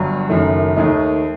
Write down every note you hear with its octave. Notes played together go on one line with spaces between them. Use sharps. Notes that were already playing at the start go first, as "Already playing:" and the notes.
Already playing: G1 G2 F#3
F#1 F#2 D#3 A3
D#2 D#3 A3 D#4